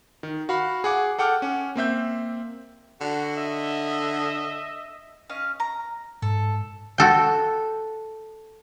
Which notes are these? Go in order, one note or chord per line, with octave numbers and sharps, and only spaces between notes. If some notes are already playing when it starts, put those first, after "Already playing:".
D#3
F#4 F5 B5
G#4 F#5 D6
A4 F#5 G5 D6 F6
C#4 F#5
A#3 C4 E5 G6
D3 F#4
D#5 E5
C#4 D#5 F5
A#5
G#2 A4
F#4 A4 G5